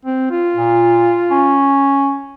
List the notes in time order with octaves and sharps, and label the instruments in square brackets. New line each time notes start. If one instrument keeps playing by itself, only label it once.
[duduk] C4
F4
[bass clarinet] A#2
C#4